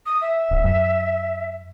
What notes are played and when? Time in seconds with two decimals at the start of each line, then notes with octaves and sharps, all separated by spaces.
0.06 D#6
0.21 E5
0.51 D1
0.64 F#2